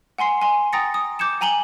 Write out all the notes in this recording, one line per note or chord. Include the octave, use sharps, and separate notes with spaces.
F#5 G#5 C6 C7
G#5 C6
G5 A#5 D#6 A6 A#6 C#7
D#6
D6 G6 G#6 C#7 E7
G5 G#5 A#5 D#7 F#7 G7